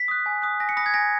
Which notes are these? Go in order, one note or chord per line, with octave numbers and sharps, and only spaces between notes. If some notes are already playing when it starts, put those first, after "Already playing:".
Already playing: B6
D#6 F#6
G#5
D#6 F#6
G#5 A#6
C#7
B5 D#6 A#6
G#6
G#5 A#6